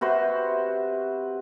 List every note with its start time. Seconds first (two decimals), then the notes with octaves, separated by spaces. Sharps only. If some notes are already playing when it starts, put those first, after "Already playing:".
0.01 C3 F#4 B4 C5